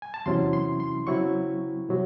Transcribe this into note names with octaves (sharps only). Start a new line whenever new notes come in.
G#5
A5
E2 C3 F#3 C#4 E4 C6
C6
C6
C#3 F#3 C4 E4 C#6
C3 F#3